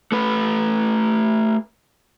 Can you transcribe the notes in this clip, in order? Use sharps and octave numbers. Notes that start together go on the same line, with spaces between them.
A3 B4